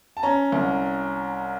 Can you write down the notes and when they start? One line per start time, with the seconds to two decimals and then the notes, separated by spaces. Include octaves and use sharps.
0.17 A5
0.23 C#4 A#5
0.52 C2